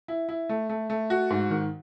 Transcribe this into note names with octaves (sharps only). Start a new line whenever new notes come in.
E4
E4
A3
A3
A3
F#4
G#2
D#3